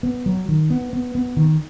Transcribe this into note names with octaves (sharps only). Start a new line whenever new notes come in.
B3
F#3
D#3
B3
B3
B3
D#3